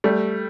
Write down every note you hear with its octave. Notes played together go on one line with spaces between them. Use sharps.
G3 A3